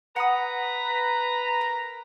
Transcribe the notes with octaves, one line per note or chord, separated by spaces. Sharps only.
B4 F#5 A#5 B5 D#6
A#4